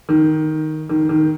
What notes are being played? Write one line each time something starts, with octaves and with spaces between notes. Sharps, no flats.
D#3
D#3
D#3